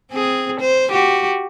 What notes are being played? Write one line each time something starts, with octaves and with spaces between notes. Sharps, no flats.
C4 G#4
C5
F#4 G4